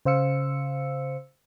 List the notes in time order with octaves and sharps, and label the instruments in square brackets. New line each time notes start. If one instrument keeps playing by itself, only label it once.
[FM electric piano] C#3 C5 F5 E6 C#7